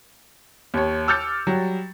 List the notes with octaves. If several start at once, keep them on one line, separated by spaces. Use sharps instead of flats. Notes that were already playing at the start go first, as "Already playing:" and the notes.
D#2 C#5
D6 E6 F6 G6 A6 C#7
F#3 G3